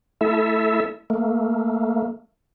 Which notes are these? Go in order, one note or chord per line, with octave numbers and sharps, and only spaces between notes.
A3 E4 A4 E5
A3 A#3